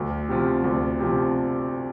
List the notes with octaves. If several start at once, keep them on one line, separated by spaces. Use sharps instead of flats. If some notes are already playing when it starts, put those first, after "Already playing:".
Already playing: D2
C3 F3
D2
C3 F3